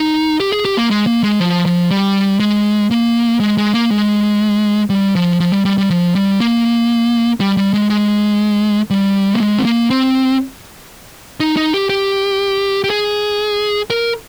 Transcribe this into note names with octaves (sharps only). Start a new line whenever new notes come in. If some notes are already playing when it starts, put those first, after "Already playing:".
Already playing: D#4
G4
G#4
G4
A#3
G#3
A#3
G#3
F3
F3
G3
G#3
A#3
G#3
G#3
A#3
G#3
G3
F3
F3
G3
G3
G3
F3
G3
A#3
G3
G3
G#3
G#3
G3
A#3
G#3
C4
A#3
C4
D#4
D#4
G4
G4
G4
G#4
A#4